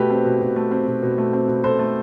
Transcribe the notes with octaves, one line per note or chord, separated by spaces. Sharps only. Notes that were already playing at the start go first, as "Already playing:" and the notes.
Already playing: B2 A3 G4 B4
C4
B2
B2
A3
C4
B2
B2
A3
C4
B2
B2 A4 C5
A3